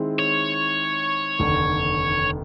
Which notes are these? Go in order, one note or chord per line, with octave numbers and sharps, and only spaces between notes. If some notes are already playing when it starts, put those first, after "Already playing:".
Already playing: D#3 G#3 C4 E4 G#4
C#5
F1 D#2 D3